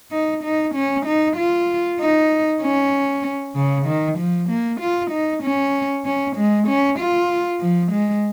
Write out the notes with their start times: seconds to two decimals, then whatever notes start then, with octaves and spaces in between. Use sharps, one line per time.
0.12 D#4
0.43 D#4
0.75 C#4
1.06 D#4
1.37 F4
2.00 D#4
2.62 C#4
3.55 C#3
3.86 D#3
4.18 F3
4.49 A#3
4.80 F4
5.11 D#4
5.43 C#4
6.05 C#4
6.36 G#3
6.67 C#4
6.99 F4
7.60 F3
7.91 G#3